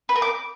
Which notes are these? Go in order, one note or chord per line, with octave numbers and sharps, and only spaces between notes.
B4
A#4
D6